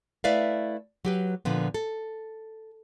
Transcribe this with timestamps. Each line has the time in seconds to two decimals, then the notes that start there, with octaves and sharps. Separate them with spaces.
0.24 A3 E4 B4 D5 E5 F5
1.05 F#3 G4 B4
1.45 A#2 D3 F3 B3
1.74 A4